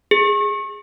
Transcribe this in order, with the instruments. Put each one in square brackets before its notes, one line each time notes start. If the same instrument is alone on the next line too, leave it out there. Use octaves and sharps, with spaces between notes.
[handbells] G#4